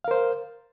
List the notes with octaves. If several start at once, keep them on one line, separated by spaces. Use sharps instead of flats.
A#4 C5 F5